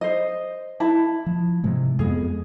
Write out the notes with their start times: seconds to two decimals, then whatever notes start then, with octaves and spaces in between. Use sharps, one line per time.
0.01 C5 D#5
0.80 E4 A5
1.26 F3
1.64 G#2 C3 G#3
1.99 F2 G#3 B3 G#4